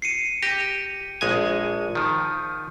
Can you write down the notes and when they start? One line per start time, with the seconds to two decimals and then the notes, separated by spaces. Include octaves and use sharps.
0.02 C7 C#7 D#7
0.43 G4 A#6 D#7
1.21 A#1 G#3 G#5
1.95 D#3 F3